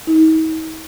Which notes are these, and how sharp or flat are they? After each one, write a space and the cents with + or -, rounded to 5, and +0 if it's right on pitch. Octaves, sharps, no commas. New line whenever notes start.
D#4 +45